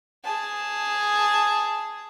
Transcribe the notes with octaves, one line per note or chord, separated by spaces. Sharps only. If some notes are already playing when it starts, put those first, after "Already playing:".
G#4 A5